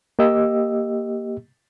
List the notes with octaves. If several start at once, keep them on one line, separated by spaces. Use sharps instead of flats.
A#3 G4 D#5 E6